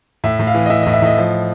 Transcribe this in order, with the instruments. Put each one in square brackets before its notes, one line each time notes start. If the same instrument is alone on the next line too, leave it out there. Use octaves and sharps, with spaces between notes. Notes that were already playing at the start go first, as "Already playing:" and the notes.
[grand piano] A2 E5
A2
F5
E3
D#5
E3 E5
D#5
A2
E5
A2 D#5
F3